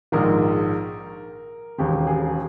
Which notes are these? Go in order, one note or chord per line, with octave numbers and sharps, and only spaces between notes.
A#1 G#2 D#3 A#4
E1 D#2 C#3 G4
G#4